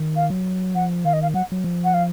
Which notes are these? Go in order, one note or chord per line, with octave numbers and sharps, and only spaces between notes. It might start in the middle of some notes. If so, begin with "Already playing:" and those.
Already playing: D#3
F5
F#3
F3 F#5
D#3 F5
D#5
F5
F#3 F#5
F#3
F3
F#5
F5